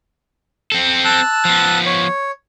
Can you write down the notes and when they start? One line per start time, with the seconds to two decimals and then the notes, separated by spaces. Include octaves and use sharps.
0.72 C4 A4
1.05 A5 E6 F#6
1.45 F3 B3
1.86 C#5